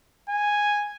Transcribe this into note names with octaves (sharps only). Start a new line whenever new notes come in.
G#5